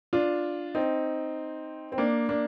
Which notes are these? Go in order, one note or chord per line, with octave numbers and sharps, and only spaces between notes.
D4 F4
C4 D#4
C4
A#3 D4
A#3 D4